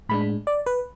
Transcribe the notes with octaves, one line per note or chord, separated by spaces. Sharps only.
A2 G#3 D4 B5
D5
B4